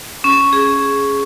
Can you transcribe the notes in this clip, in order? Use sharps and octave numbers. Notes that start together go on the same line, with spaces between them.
C#4
G#4